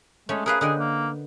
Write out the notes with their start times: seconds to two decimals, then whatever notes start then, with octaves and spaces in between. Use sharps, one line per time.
0.29 G#3 A3 C#4
0.46 G#4 A#4 B4 F5
0.61 D3 G#4 D#5 G5
0.79 A#3